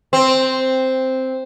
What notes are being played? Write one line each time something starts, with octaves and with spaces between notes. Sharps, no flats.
C4